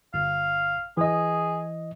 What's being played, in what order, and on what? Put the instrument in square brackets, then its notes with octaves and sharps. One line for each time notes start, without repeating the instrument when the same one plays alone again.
[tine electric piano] G1 [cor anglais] F5
[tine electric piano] E3 D#5 [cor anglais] G#4